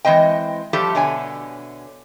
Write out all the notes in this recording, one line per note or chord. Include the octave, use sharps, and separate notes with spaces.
E3 G#3 C4 D#5 G5
F3 G3 A3 G4 A4
B2 D3 C#5 G#5